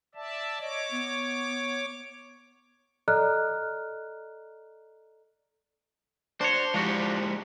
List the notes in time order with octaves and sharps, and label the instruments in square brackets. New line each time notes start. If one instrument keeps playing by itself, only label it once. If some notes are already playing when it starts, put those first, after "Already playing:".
[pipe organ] D5 E5 A5
[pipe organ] C#5 D6 [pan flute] D#5
[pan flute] B3
[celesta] A4 D5 D#5 A#5 F6 F#6
[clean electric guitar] D4 F#4 C#5 [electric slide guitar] C5
[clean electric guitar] F3 D4 F#4 [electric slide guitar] G#3 E4 G4